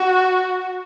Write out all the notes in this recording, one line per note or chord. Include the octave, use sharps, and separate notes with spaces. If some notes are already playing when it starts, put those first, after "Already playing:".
Already playing: F#4